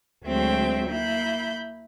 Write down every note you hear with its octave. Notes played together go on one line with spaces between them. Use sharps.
D2 F#3 G#3 C4 E5 G5
A#3 E4 B5 G6